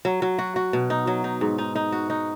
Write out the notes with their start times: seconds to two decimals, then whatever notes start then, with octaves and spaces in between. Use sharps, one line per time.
0.05 F#3
0.22 F#3
0.39 F#4
0.56 F#4
0.73 B2
0.90 D#4
1.07 F#3
1.24 D#4
1.41 G#2
1.58 D#4
1.75 D#4
1.92 F#4
2.10 D#4